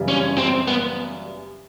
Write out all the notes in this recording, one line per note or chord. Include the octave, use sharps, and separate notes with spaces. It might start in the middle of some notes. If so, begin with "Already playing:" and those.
Already playing: F#2 C#3 E3 G3
C#4
C4
B3